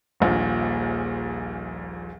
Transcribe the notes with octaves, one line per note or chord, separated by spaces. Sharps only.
D#1 A#1 A#2